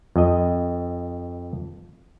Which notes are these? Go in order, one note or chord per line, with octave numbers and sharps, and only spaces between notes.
F2 D#5